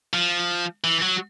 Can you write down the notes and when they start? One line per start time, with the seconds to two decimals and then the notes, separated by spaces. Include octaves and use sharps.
0.13 F3
0.84 E3
1.02 F#3